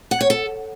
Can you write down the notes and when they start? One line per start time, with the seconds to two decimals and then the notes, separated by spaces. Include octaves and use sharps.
0.11 F#5
0.21 C#5
0.30 A4